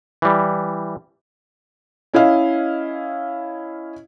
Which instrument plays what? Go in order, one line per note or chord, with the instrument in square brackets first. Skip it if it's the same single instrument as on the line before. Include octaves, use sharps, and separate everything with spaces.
[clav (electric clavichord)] E3 G3
[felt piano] C#4 E4 D#5 F5